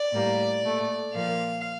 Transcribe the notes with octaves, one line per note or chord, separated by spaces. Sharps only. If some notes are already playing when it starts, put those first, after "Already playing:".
Already playing: D5
A2 G3 A#3
A#2 A3
A#2 F3 A#3 F5